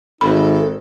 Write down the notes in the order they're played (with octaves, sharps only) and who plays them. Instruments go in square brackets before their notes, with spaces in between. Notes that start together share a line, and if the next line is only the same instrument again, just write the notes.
[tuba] G#1 [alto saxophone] D#4 [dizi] A4 [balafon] B5